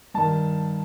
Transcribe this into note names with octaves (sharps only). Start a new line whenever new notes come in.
G2 D#3 A5